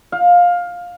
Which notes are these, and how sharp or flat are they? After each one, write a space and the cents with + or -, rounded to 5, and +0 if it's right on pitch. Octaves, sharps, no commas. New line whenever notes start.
F5 +15